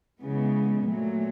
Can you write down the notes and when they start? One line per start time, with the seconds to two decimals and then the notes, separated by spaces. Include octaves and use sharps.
0.22 C#3 E3 G#3 B3
0.85 A#2 F#3 A3